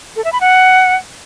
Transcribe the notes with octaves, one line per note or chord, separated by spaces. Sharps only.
A4
E5
B5
F#5